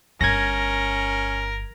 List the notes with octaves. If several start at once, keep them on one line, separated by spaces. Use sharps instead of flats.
G1 C#4 A#4 G#6 A#6